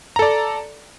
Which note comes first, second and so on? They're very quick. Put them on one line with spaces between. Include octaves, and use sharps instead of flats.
A#5 A4 D5